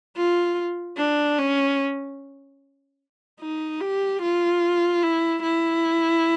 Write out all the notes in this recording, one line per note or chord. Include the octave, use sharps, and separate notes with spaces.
F4
D4
C#4
D#4
G4
F4
E4
E4